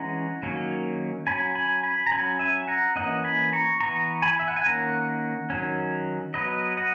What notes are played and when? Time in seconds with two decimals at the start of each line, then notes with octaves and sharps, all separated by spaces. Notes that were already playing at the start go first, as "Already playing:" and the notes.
Already playing: E3 G#3 C#4 F#5 A#5
0.43 D#3 F#3 A#3 C#4
1.27 F#3 C#4 G#5 B5
1.55 G#5 B5
1.83 G#5 B5
2.06 A#5
2.11 F#3 C#4 G#5 B5
2.39 E5 G#5
2.68 F#5 A#5
2.96 E3 A#3 C#4 D#5 F#5
3.24 G#5 B5
3.53 A#5 C#6
3.80 E3 B3 A#5 C#6
4.22 G#5 B5
4.39 E5
4.48 F#5
4.56 G#5
4.66 D#3 A#3 C#4 F#5 A#5
5.50 D#3 F#3 C#4
6.34 F#3 B3 B4 D#5
6.77 D#5 F#5